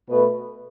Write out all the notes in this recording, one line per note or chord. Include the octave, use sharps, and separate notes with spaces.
B2 A3 B4